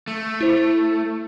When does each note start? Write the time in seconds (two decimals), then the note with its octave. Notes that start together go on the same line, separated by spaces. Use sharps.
0.08 A3
0.41 E4 C5